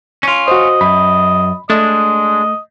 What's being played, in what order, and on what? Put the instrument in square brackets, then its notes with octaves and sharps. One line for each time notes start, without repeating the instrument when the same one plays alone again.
[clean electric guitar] C#4 F4
[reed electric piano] F#4 C5 [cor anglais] D#5
[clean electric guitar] F#2 [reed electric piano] B5
[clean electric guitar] G#3 D4 [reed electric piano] A3 [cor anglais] D#5